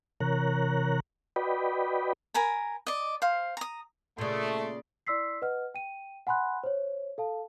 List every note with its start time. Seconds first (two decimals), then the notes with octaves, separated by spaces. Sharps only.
0.20 C3 E3 A#4 C#5 A#5 F#6
1.36 F#4 B4 D5 D#5 G5 B5
2.34 A#4 G#5 A#5 B5
2.87 D5 D#5
3.22 C5 F5
3.57 A#5 D#6
4.18 A#2 C#3 A3 D5 C6
5.07 E4 D5 C6 E6 B6 C7
5.42 B4 D#5 F#5 F6
5.74 G5 D#7
6.27 F#5 G#5 B5 C6 F#6
6.64 C5 C#5
7.18 A4 F5 A5